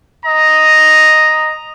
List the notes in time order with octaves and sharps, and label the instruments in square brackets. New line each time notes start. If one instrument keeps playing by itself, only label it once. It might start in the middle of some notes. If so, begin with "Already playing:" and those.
[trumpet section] D#5 A#5